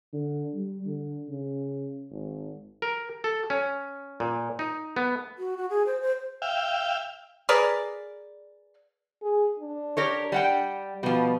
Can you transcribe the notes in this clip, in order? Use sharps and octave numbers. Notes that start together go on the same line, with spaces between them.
D3
G3
D3
C#3
G#1
A#4
A4
C#4
A#2
D#4
B3
F#4
F#4
G#4
C5
C5
E5 F5 G5
G#4 A#4 B4 D5
G#4
D4
G4 A#4 C#5
G3 F#5 G5
B2 F3 G3